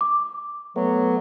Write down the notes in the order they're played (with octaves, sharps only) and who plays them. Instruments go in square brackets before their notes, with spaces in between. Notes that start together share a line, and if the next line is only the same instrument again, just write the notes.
[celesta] D6
[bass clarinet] F#3 [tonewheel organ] A3 B3